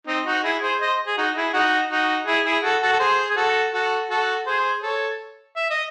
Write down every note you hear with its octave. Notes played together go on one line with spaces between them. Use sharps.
C4 D#4
D#4 F#4
E4 G#4
G#4 C5
C5 D#5
G#4
D#4 F#4
E4 G#4
D#4 F#4
D#4 F#4
E4 G#4
E4 G#4
F#4 A4
F#4 A4
A4
G#4 C5
G#4
F#4 A4
F#4 A4
F#4 A4
G#4 C5
A4 C#5
E5
D#5